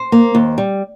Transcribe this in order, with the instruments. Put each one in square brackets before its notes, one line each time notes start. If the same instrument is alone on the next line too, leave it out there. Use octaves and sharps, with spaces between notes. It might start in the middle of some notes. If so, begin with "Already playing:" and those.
Already playing: [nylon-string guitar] C5
A#3
D#2
G3